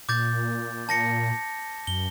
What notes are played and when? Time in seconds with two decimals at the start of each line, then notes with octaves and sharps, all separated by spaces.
0.09 A#2 D6 G6 A6
0.89 A5 A#6 C#7
1.87 F#2 G7